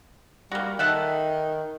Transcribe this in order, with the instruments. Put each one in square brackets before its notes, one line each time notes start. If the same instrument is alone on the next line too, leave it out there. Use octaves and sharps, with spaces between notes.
[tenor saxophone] G3 [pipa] A#3 F#4
[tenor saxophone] D#3 [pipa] A4 E5 F#5